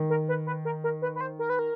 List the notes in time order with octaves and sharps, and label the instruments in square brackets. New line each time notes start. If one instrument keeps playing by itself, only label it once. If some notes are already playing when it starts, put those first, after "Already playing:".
Already playing: [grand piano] D#3
[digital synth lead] A#4
B4
B4
A#4
A#4
B4
B4
C5
A#4
B4
A#4